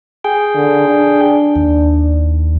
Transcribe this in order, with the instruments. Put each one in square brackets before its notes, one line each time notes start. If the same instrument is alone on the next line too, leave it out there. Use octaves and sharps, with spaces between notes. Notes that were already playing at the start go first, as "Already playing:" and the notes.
[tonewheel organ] G#4 G5
[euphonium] D3
D4
[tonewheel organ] D#2